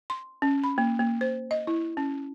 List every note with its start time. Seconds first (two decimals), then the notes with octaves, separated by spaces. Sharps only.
0.10 C6
0.42 C#4
0.64 B5
0.78 A#3
0.99 A#3
1.21 C5
1.51 D#5
1.67 E4
1.97 C#4